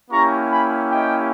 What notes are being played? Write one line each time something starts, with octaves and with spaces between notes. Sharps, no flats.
A#3 C#4 E4 G4 A#5 C#6
G#5 B5
D#5 G5